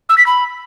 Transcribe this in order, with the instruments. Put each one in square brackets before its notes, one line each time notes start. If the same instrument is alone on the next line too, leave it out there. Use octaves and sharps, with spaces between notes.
[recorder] E6
B6
B5